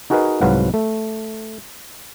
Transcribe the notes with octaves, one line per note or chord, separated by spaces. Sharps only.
D#4 F#4 G#4 A#4 B4 D#5
C2 G#2 F#3 B4 F5 F#5
A3